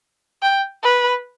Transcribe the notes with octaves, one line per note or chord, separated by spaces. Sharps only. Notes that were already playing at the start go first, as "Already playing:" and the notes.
G5
B4